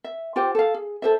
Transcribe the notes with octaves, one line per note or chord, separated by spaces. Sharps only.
E5
F4 G4 C5 G5
A4 F5
G#4
A4 C5 E5